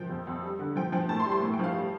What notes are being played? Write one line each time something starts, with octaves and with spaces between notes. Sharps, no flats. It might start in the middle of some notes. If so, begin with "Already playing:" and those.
Already playing: F3 G5
F2
F2
G3
D3
F3 G5
F3 G5
A2 A5
C6
G3
C6
A2
G5
F3 F5
G3